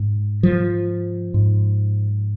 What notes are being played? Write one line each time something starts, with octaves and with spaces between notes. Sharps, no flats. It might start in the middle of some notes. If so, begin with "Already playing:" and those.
Already playing: G#2
F3
G#2